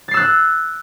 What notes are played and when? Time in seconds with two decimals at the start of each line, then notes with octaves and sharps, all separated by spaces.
0.08 A6
0.11 C7
0.14 E6
0.17 F#6